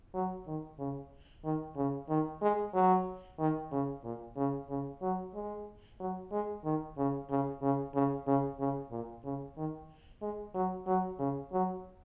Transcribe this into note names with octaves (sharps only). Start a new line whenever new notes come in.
F#3
D#3
C#3
D#3
C#3
D#3
G#3
F#3
D#3
C#3
A#2
C#3
C#3
F#3
G#3
F#3
G#3
D#3
C#3
C#3
C#3
C#3
C#3
C#3
A#2
C#3
D#3
G#3
F#3
F#3
C#3
F#3